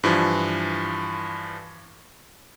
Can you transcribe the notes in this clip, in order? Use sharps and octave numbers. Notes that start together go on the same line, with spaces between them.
G2 E3 F3